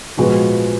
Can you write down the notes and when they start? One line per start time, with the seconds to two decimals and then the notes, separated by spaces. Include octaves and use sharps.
0.17 A#2 F3 G#3 B3 F#4